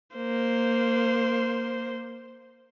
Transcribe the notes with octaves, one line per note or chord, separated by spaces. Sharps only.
A#3 C5